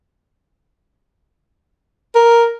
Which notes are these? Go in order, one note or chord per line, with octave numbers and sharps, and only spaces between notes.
A#4